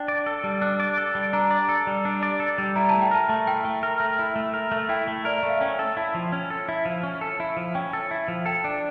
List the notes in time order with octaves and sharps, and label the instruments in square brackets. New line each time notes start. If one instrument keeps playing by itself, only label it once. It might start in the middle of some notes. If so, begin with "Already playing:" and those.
Already playing: [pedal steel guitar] D4 [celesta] G5
[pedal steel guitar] D5
A4
G3
D4
D5
A4
G3
[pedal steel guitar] D4 [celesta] A#5
[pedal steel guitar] D5
A4
G3
D4
D5
A4
G3
[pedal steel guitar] E4 [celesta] A#5
[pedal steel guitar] A3 [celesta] A5
[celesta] G5
[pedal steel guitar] A#4 [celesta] A5
[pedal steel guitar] A3
[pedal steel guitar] E4 [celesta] G5
[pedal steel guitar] A3
A#4
A3
E4
A3
A#4
A3
[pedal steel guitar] E4 [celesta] G5
[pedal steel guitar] A3
[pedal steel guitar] A#4 [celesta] D5
[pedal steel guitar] A3 [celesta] E5
[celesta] F5
[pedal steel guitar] C#4 [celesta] G5
[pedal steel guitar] A4
[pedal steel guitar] E4 [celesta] A5
[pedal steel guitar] F3
C#4
A4
E4
F3
C#4
A4
E4
F3
[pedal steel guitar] C#4 [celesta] G5
[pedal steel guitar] A4
E4
F3
[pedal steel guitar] A4 [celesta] G5
[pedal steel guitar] D4